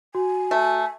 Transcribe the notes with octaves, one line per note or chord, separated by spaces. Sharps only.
F#4 G#5
A3